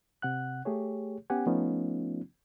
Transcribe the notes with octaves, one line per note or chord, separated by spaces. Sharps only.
C3 F#5 F#6
A3 G4 G#4 C#5
B3 C#4 G4 F#5 G#5
F3 A3 B3 C#4 D#4 F4